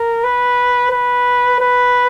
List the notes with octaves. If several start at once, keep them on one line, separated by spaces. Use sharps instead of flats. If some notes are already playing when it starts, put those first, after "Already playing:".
Already playing: A#4
B4
B4
B4